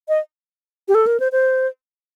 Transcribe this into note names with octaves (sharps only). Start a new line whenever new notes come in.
D#5
G4
A4
A#4
C5
C5